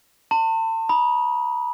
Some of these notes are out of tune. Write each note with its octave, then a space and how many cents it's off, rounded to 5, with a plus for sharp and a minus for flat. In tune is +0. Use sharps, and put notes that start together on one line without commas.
A5 +40 C6 +0
B5 -30 D#6 +0